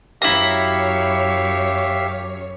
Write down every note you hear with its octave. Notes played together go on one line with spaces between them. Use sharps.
F#2 E4 G4 C#5 E5 F5 A#5